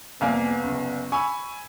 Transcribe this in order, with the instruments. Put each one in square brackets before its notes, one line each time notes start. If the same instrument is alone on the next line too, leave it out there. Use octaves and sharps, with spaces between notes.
[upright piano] C2 F5 G#5 [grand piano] F2 A#3 [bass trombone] B3
[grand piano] F#1
[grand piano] G#5 B5 E6 [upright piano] C#6